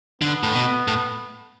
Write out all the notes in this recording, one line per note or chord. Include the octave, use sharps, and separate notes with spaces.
D3 B3
A2
B2
A2